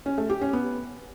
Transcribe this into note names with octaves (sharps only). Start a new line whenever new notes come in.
C#4
A3
G4
C#4
B3